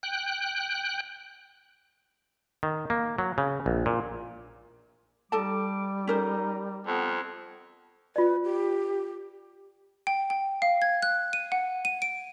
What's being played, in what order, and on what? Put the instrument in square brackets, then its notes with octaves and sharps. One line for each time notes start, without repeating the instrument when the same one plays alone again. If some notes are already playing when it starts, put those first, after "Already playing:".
[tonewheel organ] G5 F#6
[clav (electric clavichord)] D#3
A#3
F#3
C#3
A#1
A#2
[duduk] G3 [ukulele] D#4 A4 A5 [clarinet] D6
[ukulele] C#4 A#4 C5 [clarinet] D#4
[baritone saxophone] F2 [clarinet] B3
[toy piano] F4 D5 [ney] B4
[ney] G4
[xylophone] G5
G5
F5
G#6
F#6
D#7
F#5
D#7
D7